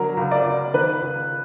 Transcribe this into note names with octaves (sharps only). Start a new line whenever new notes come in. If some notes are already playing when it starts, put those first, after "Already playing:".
Already playing: D3 F#3 A#4
C#2
D5
C#2
D#3 B4
C#2